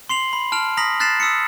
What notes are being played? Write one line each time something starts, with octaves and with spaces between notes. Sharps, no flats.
C6 C7 F7 F#7
B5
A5 F6 D7 F7
A#5 D#6 A#6 B6 F#7
F6 F#6 A6 B6 C7 E7
D#6 E6 B6 C#7